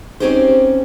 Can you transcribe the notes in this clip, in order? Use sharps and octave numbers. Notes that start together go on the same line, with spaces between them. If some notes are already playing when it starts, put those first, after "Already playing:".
C4 C#4 D#4 G4 G#4 C5